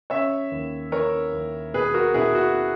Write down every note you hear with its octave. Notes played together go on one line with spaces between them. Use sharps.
C#3 C#5 E5
D#2
E3 A#4 C#5
D#2
B2 G#4 B4
F#4 A#4
B2 E4 G#4
F#4